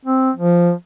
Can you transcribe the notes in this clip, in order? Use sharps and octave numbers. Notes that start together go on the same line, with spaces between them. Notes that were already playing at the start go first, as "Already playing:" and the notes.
C4
F3